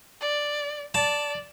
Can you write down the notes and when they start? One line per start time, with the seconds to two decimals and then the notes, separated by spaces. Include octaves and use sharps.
0.21 D5
0.94 D5 A5